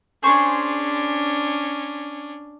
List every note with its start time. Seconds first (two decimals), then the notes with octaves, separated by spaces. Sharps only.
0.23 C#4 D4 G#4 C5 C#6